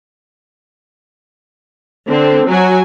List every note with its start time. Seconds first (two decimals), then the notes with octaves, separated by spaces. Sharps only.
2.07 D3 C4
2.48 F#3 F#4 G#5